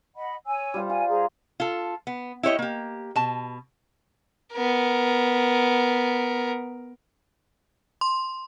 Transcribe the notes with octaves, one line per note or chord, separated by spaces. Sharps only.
D#5 F#5 B5
C#5 G#5 E6
G3 F4 C5
F4 G#5
G#4 C5 A#5
F4 A4
B3
E4 G4 C#5 D#5
A#3 G4
B2 A5
B3 A#4
C6